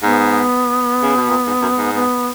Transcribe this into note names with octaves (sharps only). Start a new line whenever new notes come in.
G#2 B3
C#3
B2
A#2
G#2
F#2
G#2
B3